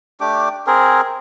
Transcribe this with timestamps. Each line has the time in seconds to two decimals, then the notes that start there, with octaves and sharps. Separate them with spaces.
0.21 A3 D4 G4 D6
0.67 C4 G#4 A#4